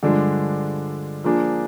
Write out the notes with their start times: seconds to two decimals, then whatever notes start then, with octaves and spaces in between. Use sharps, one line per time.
0.03 G2 D3 F3 G#3 D4
1.24 F3 A#3 D4 G#4